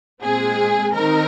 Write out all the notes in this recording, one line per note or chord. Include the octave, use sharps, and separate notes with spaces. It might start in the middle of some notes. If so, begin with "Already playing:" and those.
A#2 G#3 C4 G#4
D#3 C4 D#4 A#4